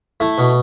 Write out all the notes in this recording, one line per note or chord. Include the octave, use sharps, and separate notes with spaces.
A3 E4
B2